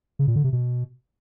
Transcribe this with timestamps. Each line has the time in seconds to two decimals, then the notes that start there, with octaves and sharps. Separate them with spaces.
0.19 C#3
0.28 A#2
0.36 D3
0.44 C3
0.53 B2